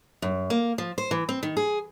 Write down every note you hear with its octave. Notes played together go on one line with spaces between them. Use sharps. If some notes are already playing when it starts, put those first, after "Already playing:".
F#2
A#3
F3
C5
E3
C4
D#3
G#4